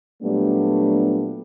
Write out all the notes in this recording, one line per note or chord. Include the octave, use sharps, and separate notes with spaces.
A#2 F#3 G3 A3 B3 D4